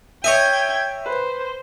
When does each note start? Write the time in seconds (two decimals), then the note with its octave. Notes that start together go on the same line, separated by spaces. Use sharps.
0.24 C#5 D#5 E5 G5 G#5 G#6
1.06 B4 C5